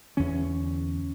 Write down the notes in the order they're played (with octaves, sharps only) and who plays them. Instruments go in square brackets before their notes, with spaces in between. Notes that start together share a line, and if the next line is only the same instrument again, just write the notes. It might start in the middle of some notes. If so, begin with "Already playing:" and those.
[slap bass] E2 D3 C#4